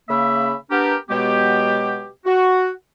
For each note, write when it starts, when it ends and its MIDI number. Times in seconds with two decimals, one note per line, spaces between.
0.09 0.55 49
0.09 0.55 58
0.09 0.55 76
0.09 0.55 83
0.71 0.95 59
0.71 0.95 62
0.71 0.95 67
0.71 0.95 70
1.09 2.07 47
1.09 2.07 54
1.09 2.07 56
1.09 2.07 59
1.09 2.07 67
2.25 2.69 66